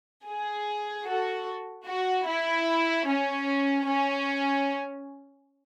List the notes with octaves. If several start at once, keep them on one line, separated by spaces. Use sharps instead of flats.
G#4
F#4 A4
F#4
E4
C#4
C#4